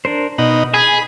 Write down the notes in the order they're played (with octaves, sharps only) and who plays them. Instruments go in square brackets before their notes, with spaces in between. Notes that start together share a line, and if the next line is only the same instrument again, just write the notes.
[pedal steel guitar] D4 A#4 C5
[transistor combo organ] B2 D#4 [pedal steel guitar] B5
[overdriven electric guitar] G#4 [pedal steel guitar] G#5 [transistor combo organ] B5